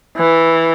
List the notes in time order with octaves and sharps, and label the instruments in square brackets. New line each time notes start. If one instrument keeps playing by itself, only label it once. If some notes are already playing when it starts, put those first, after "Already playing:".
[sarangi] E3